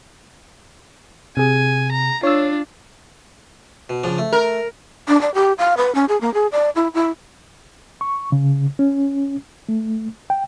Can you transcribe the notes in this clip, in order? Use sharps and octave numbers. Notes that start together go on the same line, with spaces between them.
C3 G#4 G#5
A#5
D4 F4 C#5 E6
B2
C#3 F3 D4
A3
A#4
D4
D5
G4
F5
B4
C#4
G#4
A#3
G#4
D5
E4
E4
C#6
C#3
C#4
A3
G5